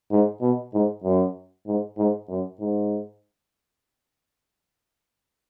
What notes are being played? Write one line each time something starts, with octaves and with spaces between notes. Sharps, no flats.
G#2
B2
G#2
F#2
G#2
G#2
F#2
G#2